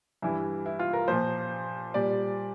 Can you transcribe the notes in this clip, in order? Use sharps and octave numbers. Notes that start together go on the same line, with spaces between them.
G2 E3 G3 E4
E4
F4
A#4
A#2 F3 C5
A#2 G3 D5